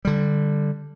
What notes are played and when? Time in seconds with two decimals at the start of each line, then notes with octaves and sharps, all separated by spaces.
0.05 D3 G3